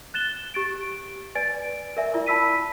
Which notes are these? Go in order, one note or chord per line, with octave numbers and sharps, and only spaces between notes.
F#6 A6 E7 G7
G4 A6 D7
B4 D5 G#5 A6 D7
A#4 D5 E5 G#5
E4 F4 A#4 D5
A5 B5 E6 B6 D#7